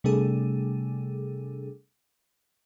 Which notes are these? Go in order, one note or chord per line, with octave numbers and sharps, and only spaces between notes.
C3 G3 A3 D4 G#4 A4